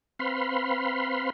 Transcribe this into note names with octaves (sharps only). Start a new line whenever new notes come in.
C4 B4 F5 B5 C6